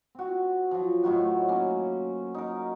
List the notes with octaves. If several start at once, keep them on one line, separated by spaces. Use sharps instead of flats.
C4 F#4
F3 F#3
A2 D#3 F#3 F#4
F#3 A#3 C#4
D#4 A#4